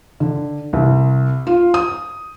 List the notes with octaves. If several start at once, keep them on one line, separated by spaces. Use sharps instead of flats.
D3
C2
F4
D#6